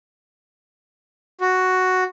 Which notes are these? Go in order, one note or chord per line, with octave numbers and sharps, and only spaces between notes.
F#4